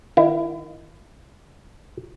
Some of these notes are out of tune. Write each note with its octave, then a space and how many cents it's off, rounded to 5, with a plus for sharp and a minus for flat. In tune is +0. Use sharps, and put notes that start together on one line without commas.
D#3 +0 E4 +30